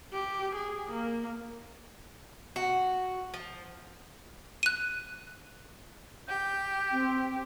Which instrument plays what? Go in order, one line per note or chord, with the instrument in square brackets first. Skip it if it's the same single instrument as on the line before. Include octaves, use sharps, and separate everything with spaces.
[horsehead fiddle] G4
G#4
A#3
[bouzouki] F#4
F3
[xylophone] F#6 D#7
[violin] G4 [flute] G6
[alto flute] C4